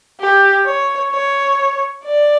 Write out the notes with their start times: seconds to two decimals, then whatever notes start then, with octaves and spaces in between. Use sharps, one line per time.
0.20 G4
0.66 C#5
1.11 C#5
2.04 D5